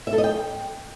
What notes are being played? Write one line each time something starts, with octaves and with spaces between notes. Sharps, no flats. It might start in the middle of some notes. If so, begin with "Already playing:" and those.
E5
A4
D#5
G5